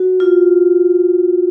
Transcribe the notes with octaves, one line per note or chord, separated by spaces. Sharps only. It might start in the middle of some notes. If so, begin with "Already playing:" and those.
Already playing: F#4
F4